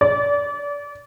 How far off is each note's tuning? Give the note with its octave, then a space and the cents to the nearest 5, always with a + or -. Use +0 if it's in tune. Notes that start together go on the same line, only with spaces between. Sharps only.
D5 -30